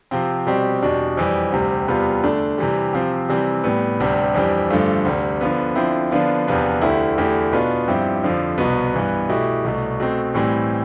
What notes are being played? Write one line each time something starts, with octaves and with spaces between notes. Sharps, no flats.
C3 F3 C4
B2 G3 C4 G4
E2 B2 G3 D4
F2 E3 G3
D2 C3 G3
E2 C3 G3 B3 F4
D3 A3 D4
C3 E3 G3
C3 F3 C4 G4
C3 E3 G3 C4
A2 G3 B3
D2 C3 G3 D4
F2 E3 G3 D4
G2 D3 F3 A3
D2 C3 G3
D3 F3 B3
D3 F3 C4 E4
D3 F3 B3 D4 F4
E2 C3 F3 B3 D4
D2 D3 A3 E4 G4
E2 D3 A3 E4 G4
B2 B3 D4 F4
G2 F3 C4 E4 G4
F2 D3 F3
C2 B2 B3
G2 E3 B3
B2 A3 E4 G4
C2 B2 A3
B2 A3 C4
A2 E3 G3 C4